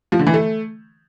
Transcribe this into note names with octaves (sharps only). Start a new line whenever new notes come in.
F3
D3
E3
A3